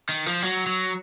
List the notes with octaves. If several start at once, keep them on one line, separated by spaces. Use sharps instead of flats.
D#3
F3
F#3
F#3